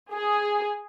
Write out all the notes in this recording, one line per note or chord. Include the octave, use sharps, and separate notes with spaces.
G#4